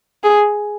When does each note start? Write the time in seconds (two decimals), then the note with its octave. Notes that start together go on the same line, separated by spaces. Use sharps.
0.24 G#4